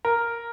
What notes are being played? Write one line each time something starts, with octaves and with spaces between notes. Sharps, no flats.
A#4